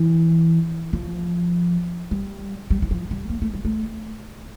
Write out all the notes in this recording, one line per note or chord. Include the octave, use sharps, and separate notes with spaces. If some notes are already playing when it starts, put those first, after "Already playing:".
Already playing: E3
F3
G3
G3
E3
F3
G3
A#3
A3
G3
A3